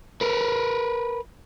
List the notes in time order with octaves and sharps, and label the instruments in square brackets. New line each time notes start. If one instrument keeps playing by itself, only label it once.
[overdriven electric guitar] A#4 B4